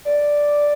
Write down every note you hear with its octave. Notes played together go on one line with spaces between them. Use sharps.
D5